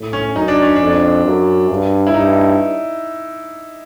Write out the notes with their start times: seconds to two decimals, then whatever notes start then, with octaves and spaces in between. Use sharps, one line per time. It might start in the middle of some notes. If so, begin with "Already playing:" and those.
Already playing: A2
0.13 C#4
0.35 F#2 D#4
0.48 D4
0.62 C#4
0.76 F2 D4
1.25 F#2
1.70 G2
2.07 E4
2.14 G2 D#4